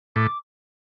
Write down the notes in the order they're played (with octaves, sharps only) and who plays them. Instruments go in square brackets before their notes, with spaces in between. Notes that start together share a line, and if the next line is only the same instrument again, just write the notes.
[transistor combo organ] A2 [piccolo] D6